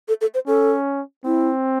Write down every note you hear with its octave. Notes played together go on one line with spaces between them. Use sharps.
A4
A4
C5
C#4 A4
C4 E4